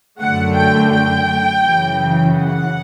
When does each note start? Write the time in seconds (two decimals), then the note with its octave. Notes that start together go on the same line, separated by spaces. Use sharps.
0.20 F#2 D3 A3 F#5
0.55 G5
0.91 G5
1.63 F#2 C#3 E3
2.34 F#5